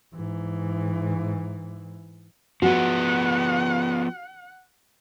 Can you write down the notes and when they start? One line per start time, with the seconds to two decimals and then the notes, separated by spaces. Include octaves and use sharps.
0.14 G#2 E3
2.62 F3 B3 F#4 F#5